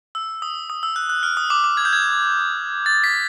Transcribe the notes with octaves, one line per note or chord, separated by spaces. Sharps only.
E6
D#6
D#6
E6
F#6
F#6
F6
D#6
D6
D6
G#6
G6
G#6
A6
B6